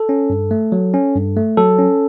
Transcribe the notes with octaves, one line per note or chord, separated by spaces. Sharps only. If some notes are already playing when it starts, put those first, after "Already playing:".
Already playing: A4
C#4
G2
A3
F#3
C#4
G2
A3
F#3 A4
C#4